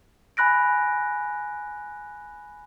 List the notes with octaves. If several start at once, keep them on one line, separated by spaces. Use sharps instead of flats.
G#5 B5 F#6 A#6 D7